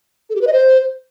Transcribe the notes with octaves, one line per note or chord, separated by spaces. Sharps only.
A4
G4
B4
D#5
C5